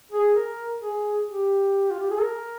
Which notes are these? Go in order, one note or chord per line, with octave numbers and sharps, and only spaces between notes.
G#4
A#4
G#4
G4
F4
G4
G#4
A#4